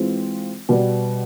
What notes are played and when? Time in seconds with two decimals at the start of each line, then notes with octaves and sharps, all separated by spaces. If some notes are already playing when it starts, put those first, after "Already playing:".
Already playing: E3 G#3 C4 F4
0.69 B2 G3 B3